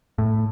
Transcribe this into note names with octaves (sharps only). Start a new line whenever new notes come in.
A2